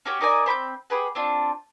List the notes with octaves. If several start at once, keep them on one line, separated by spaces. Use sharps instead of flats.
C#4 F#4 G4 C#5
D#4 A#4 D5 G#5
C4 B5 D6 G6
G4 G#4 B4 F#5
C4 D4 F4